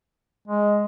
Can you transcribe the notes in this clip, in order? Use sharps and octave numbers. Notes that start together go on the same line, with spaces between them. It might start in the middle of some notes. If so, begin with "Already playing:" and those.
G#3